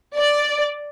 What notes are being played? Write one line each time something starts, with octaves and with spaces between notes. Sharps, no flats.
D5